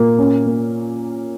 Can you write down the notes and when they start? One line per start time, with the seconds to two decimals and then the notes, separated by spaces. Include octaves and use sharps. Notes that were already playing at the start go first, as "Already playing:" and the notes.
Already playing: A#2 A#3
0.19 C#4
0.46 A#3